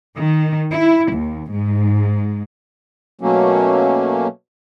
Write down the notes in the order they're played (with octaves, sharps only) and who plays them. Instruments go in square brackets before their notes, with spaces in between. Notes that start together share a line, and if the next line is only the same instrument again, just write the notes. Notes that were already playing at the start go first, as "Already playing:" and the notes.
[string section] D#3
E4
D#2
G#2
[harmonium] B2 F#3 A3 A#3 C#4